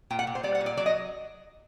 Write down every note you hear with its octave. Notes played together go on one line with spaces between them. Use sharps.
A#2 G5
F#5
A#2
C5
G3 D5
F#5
A#2
D5
F#3 D5
D#5